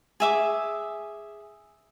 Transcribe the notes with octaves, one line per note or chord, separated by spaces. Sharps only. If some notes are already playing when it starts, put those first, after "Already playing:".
G#4 E5 D6